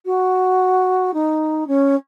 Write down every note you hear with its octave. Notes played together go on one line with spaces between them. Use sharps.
F#4
D#4
C#4